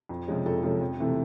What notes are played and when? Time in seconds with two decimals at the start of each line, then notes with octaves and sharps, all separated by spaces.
0.09 F2
0.27 C3 F3 G#3 C#4
0.46 F2 A4
0.63 C3 F3 G#3 C#4 A4
0.81 F2
0.99 C3 E3 A3 C4